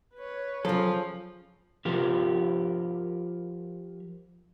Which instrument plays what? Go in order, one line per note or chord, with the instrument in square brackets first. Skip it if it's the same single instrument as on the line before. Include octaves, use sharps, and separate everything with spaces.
[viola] B4 C#5
[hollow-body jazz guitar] C#3 A4 [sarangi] F3 [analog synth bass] F#3
[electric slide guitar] F3 F4 G4 A#4